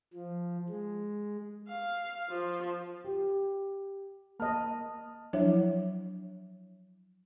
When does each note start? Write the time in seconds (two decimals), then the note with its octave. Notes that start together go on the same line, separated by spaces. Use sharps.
0.14 F3
0.69 G#3
1.69 F5
2.30 F3
3.04 G4
4.40 A#3 D#5 A5 F6
5.33 F3 F#3 D4 E4 C#5 E5